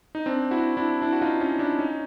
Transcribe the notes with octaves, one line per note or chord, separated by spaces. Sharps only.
D#4
C4 D4
E4 F#4
D4 E4
D4 E4
F#4
D#4 F4
C#4 D#4
D4 E4
C#4 D#4